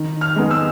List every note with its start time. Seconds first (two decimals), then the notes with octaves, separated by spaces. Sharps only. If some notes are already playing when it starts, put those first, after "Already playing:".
Already playing: D#3
0.21 F6
0.36 G#3 B3 D#4
0.51 E6